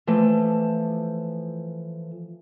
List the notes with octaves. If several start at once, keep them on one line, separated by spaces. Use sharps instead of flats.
E3 F3 A3